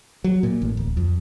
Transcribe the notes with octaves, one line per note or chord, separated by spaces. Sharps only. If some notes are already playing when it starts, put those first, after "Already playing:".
F#3
A#2
A1
D1
F2